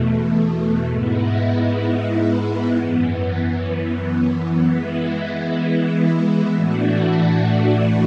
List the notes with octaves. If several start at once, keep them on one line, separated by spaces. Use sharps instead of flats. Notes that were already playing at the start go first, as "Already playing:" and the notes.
Already playing: E2 B2 A3
G#2 G#3 B3 E4
F#2 E3 B3
E3 G#3 B3 E4
A2 E3 A3 D4 F#4